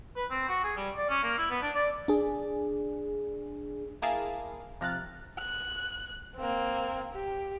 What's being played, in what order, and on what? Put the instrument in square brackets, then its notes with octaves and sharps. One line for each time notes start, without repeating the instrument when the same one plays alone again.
[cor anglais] B4
C4
F#4
G#4
G3
D5
C#4
A#3
E4
B3
D4
D5
[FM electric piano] D4 G#4
[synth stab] A#3 E4 G#4 A#4 F5 A5
C3 F3 A#5 F6 F#6 A6
[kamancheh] F#6
A#3 C4
G4